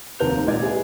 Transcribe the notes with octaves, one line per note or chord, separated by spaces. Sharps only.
F1 D#2 C3 A#4 G6 F7
C#2 A#2 D5 D#5 G#6
E4 G#4 B4 D#5 G#5